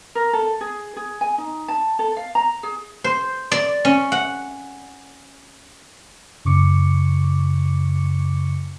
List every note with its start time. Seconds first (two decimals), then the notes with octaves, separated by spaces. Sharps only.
0.15 A#4
0.33 A4
0.61 G#4
0.96 G#4
1.21 G#5
1.38 D#4
1.68 A5
1.99 A4
2.17 F5
2.35 A#5
2.63 G#4
3.04 C5
3.52 D5
3.85 C#4
4.12 F#5
6.45 F#2 C#3 C#6 D6 C#7